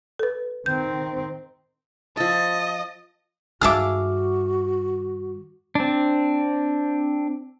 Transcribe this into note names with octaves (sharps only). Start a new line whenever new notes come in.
A4 B4
D#3 C4 G6
F3 A4 D#5 A5
G2 D#3 F#4 G#4 A4 E5 D6 F6
C4 D4